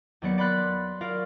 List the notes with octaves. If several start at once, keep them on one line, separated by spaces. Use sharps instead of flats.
D#2 F#3 B3 D5 C#7
D5 B5 C6 F#6 A6
F4 F#4 A#4 D5 F5